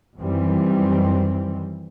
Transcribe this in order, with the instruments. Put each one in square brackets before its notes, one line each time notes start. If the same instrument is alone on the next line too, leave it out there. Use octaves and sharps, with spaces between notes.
[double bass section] F#2 D#3 E3 G3 C4